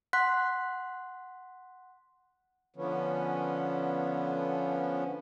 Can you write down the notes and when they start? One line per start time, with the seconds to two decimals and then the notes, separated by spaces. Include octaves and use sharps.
0.13 F#5 C6 F#6 B6
2.76 D3 F3 B3 C#4